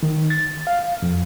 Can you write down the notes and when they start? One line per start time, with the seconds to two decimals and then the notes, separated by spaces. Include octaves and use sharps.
0.03 D#3
0.30 A6
0.67 F5
1.02 F2